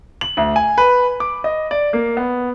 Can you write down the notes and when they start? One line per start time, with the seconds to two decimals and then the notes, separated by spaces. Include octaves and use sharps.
0.21 F#7
0.37 D2
0.56 G#5
0.78 B4
1.20 D6
1.44 D#5
1.71 D5
1.93 A#3
2.17 B3